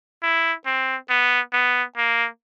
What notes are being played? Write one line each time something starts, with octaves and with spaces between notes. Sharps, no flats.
E4
C4
B3
B3
A#3